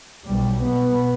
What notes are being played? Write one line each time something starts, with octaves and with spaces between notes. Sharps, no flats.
B1 G3
B2 B3